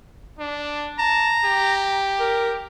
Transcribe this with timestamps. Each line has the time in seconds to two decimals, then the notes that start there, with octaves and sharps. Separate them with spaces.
0.39 D4
0.98 A5 A#5
1.45 G4
2.20 A#4